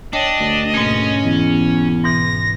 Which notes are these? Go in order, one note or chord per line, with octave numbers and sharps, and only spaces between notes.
D4 C#5 D#5 G5 A5
D2
G#2 B2 A#3 C#4
E2
G#2 B2 E3 A#6